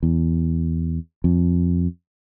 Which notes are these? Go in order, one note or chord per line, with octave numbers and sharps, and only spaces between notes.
E2
F2